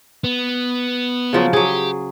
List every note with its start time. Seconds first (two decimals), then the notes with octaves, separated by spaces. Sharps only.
0.24 B3
1.33 C#3 F3 F#3
1.53 F#3 G4 G#4